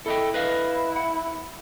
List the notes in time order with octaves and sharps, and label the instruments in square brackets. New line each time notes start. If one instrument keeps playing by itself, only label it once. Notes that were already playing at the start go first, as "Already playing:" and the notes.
[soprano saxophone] E4 [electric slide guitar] A4 D#5 G5
[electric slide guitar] B4 D#5 F5
F#5